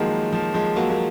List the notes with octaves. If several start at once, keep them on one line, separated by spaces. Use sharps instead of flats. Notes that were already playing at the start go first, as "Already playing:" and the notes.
Already playing: D#3 F3 F#3 G#3 A#3
F3
F3 G#3
F#3 A#3
A#3